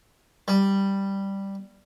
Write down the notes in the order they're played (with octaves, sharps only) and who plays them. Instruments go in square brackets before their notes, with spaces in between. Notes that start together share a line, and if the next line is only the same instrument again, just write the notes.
[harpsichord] G3